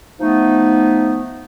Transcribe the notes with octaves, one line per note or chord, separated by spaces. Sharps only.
F3 A3 B3 D#4